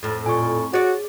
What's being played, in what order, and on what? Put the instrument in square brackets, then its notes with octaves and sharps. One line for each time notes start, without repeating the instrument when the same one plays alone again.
[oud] F2 A2
[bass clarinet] A#2 [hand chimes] G#5 C#6
[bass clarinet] F#4 [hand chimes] G#4 [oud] C#5 D5